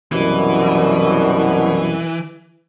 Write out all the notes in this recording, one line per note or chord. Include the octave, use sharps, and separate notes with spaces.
C2 F#2 B2 E3